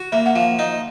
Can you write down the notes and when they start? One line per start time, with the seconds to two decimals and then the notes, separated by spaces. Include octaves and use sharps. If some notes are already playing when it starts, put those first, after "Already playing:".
Already playing: F#4
0.12 A#3 E5
0.26 F#5
0.36 F3 F5
0.59 D#4 D#5